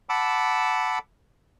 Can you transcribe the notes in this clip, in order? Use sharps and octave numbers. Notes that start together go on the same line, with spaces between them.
F#5 A5 B5 D6 E6